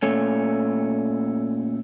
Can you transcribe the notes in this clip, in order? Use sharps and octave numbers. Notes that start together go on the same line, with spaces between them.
A#2 A3 C#4